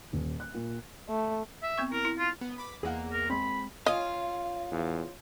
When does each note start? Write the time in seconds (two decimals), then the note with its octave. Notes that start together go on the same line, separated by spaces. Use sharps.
0.13 D#1
0.40 F#6
0.54 A#2
1.09 A3
1.63 E5
1.78 B3 C4 C#6
1.92 E4 A#4
2.05 E4
2.19 F4
2.41 B3
2.58 B5 D6
2.83 E2 A#3 G#4 D#5 F#5
3.12 A#4
3.30 G#3 C4 B5
3.86 C#4 F4 D#5 F5
4.72 E2